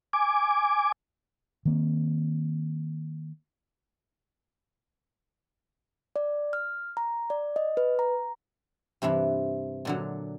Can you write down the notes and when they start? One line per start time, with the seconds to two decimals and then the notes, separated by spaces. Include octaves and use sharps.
0.13 G#5 D6
1.65 D#3 A#3 C4
6.16 D5
6.53 F6
6.97 A#5
7.30 D5
7.56 D#5
7.77 B4
7.99 A#5
9.02 G2 C3 E3 E4
9.85 A#2 D3 F#3